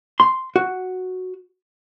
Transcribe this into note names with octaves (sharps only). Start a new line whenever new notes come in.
C6
F#4